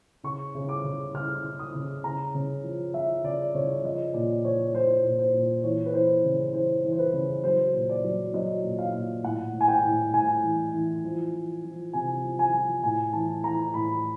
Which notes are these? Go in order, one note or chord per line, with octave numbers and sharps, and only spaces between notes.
C#3 C#6
C#3
D6
C#3
C#3 F6
C#3
D#6
C#3
C#3 A#5
C#3
F3
F3 E5
C#3 D5
C#3 C#5
F3 D#5
A#2 D5
F3 C#5
F3 C5
A#2
C5
A#2
E3 C#5
B4
E3 C5
C#3
E3 C5
E3
C5
B4
C#3
F#3 C5
A#2
D5
F#3
F#3 D#5
A#2
F5
A#2
A2 F#5
A2
G#5
G5
A2
A2 G#5
E3
E3
F3
F3
F3
C3 G#5
F3
G#5
F3
A2 G#5
E3 A5
E3 A#5
A2 B5